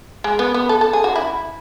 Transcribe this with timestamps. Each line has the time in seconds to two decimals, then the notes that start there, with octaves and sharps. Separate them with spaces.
0.24 G#3
0.39 B3
0.54 B3
0.69 A4
0.81 A4
0.93 G#4
1.04 F#4
1.16 E4